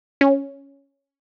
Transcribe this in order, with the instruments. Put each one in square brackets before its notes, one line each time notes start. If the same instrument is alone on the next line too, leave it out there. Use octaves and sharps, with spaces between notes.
[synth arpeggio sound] C#4